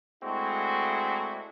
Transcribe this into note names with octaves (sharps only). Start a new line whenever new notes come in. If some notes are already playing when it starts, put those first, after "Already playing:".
G#3 A3 C4 D4 E4 F#4